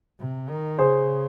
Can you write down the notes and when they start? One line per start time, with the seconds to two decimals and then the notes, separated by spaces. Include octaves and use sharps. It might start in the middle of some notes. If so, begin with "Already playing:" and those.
0.20 C3
0.49 D#3
0.79 C#3 G#4 C5